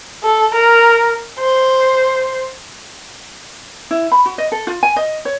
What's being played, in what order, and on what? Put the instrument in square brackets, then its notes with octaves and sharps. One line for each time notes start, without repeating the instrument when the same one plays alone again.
[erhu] A4
A#4
C5
[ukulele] E4
B5
F#4
D#5
A4
F4
G#5
D#5
C#5